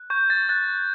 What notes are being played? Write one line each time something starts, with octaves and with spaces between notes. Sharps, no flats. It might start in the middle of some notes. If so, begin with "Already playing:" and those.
Already playing: F#6
C#6 G6
A6
F#6 A6